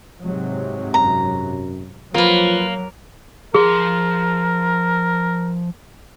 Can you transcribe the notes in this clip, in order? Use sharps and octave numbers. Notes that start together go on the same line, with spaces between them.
G#2 C3 F#3
F#2 A#5
F3 F#3 A#3 F4 B4
F3 G#4 A#4 C6